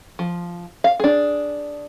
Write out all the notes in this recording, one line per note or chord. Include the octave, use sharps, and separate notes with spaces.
F3
F5
D4 G#4